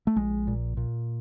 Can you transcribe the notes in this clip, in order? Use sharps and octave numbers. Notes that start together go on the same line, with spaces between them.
A3
A#1 G#3
A#2
A#2